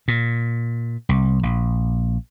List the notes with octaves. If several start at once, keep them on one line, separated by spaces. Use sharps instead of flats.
A#2
C2
A#1